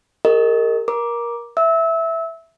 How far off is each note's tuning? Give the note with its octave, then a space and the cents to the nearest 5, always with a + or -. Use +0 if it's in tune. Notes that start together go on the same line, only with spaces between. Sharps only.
G4 +40 A#4 -25 D#5 +0
A#4 +20 D6 +0
E5 +0 E6 -25